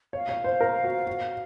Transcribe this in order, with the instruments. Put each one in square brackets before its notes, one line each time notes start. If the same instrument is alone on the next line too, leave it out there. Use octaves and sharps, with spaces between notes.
[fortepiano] C#5 [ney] F5
[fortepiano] C#5
C5
A#4
F#4
F#4